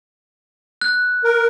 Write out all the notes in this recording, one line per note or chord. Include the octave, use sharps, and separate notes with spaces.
F#6
A#4